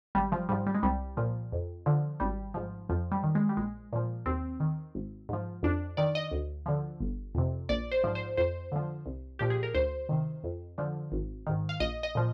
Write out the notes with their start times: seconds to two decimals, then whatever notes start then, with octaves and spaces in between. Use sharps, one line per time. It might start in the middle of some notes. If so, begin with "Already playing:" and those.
0.15 G#1 G3
0.32 F3
0.49 G#2 F3 G3
0.66 G3
0.75 G#3
0.83 C2 G3
1.17 A#2 F3
1.52 F2
1.86 D3 F3
2.20 G#1 G3
2.54 G#2 F3
2.89 F2 F3
3.12 G3
3.23 D#3
3.35 G#3
3.49 G3
3.57 A#1 G#3
3.92 A#2 F3
4.26 D#2 C4
4.60 D#3
4.95 G#1
5.29 G#2 F3
5.63 F2 D4
5.97 D#3 D5
6.15 D#5
6.31 D2
6.66 D3 F3
7.00 G1
7.35 F2 C3
7.69 A#1 D5
7.92 C5
8.04 G#2 F3
8.15 C5
8.37 F2 C5
8.72 D3 F3
9.06 C2
9.39 A#2 F3 G4
9.50 G#4
9.63 A#4
9.74 D2 C5
10.09 C3 D#3
10.44 F2
10.78 D3 F3
11.12 G#1
11.47 G#2 D#3
11.69 F5
11.80 A#1 D#5
12.03 D#5
12.15 A#2 F3